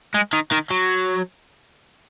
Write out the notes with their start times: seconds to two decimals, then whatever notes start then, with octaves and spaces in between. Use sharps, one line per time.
0.15 G#3
0.33 D#3
0.52 D#3
0.71 F#3